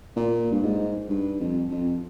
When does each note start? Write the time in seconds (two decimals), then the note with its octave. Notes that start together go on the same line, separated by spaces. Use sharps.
0.16 A#2
0.52 G2
0.62 G#2
1.09 G2
1.40 F2
1.71 F2